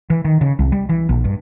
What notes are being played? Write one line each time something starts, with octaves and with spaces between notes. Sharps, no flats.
E3
D#3
C#3
C2
G3
E3
A#1
G2